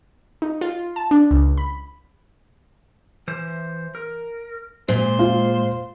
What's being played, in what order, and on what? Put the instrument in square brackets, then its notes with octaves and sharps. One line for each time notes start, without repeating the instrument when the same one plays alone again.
[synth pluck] D#4
F4
A5
D4
C#2
B5
[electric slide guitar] E3 C5
A#4
[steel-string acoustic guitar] A#2 [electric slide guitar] G#3 [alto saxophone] C5
[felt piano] F4